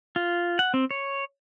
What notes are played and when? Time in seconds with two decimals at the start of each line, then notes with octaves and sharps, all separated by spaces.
0.16 F4
0.59 F#5
0.74 C4
0.91 C#5